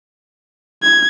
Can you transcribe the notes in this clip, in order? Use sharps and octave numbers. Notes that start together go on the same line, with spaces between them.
G#6